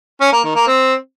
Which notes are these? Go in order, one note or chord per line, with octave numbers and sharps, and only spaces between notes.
C#4
A#3
D#3
A#3
C4